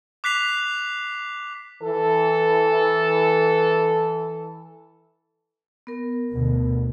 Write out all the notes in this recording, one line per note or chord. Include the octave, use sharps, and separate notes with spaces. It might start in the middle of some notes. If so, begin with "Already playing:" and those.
D6 F#6 B6 C7 F7
E3 A4
B3 A#4
D2 B2